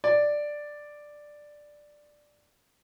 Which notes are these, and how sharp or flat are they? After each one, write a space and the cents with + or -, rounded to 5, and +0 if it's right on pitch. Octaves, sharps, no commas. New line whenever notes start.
D5 +5